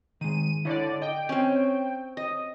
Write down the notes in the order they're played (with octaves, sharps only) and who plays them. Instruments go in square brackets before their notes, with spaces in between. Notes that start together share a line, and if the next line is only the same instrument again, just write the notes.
[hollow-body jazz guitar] D#3 G#3 [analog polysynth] D#7
[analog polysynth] D3 D5 [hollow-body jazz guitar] E4 C#5
[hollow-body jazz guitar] D#5 [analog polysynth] G5
[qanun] C4 C#4
D#5